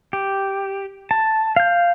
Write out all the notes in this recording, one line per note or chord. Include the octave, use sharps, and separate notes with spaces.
G4
A5
F5 G6